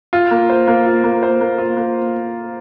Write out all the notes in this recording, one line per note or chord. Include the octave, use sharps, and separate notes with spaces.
F4
A#3
C5
A#3
F4
A#3
C5
A#3
F4
A#3